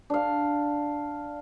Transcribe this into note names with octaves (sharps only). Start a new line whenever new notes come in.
D4 F5